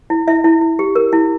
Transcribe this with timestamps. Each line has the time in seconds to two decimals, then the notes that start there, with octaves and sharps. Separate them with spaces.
0.10 E4
0.28 E4 E5
0.44 E4
0.62 E4
0.79 G4
0.95 A#4
1.13 E4